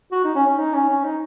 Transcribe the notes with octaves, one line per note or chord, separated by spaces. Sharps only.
F#4
D#4
C#4
C#4
D#4
C#4
C#4
D#4